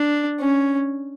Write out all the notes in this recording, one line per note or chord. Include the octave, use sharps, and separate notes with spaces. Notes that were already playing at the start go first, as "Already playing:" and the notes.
Already playing: D4
C#4